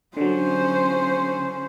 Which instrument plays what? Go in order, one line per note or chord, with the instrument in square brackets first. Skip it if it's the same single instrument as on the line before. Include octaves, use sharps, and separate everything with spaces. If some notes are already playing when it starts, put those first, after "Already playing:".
[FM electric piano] D3 F#3 [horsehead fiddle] C#4 C5